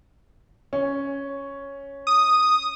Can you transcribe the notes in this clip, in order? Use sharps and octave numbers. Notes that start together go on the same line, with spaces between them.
C#4
D#6